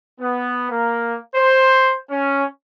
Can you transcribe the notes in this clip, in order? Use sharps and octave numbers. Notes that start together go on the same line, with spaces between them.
B3
A#3
C5
C#4